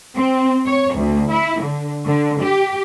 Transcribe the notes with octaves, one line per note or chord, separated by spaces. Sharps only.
C4
C#5
D2
E4
D3
D3
G4